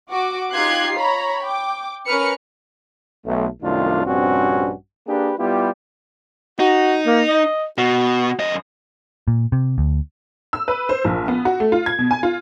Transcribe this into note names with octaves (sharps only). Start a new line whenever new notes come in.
F#4 D6
D#4 F4 G4 F#6 G#6 C7
C#5 A#5 B5
G5 D6
C#4 A#4 B4 F6 C#7
B1 A3
C2 F#2 D#3 A3 D4 F4
A#1 G2 C3 C4 C#4 F#4
A#3 D4 G4 G#4 B4
G3 B3 E4 F4 G4
D#4 F#4
A#3
D#5
B2 F#4
F#2 D#5
A#2
C3
D2
E6
B4
C5
A#1
B3
F#4
A3
F4
G#6
B2
G#5
F4